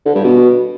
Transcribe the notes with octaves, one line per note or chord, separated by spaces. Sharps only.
D3
G2
B2